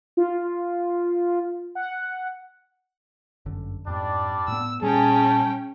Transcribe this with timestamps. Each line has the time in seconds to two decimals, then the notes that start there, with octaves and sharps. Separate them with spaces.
0.17 F4
1.75 F#5
3.46 G1 F#2 D3
3.87 F2 G#2 G3 D4 D5
4.48 A2 B3 E6
4.82 A#2 G3 C#4 G#4 G5 A5